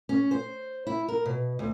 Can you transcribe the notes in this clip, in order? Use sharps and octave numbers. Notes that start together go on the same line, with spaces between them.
C#4
C5
E4
A#4
B2
D2